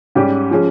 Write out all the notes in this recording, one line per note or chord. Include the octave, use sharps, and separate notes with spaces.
G#2 G3 C#4 G4
F3 G#3 C#4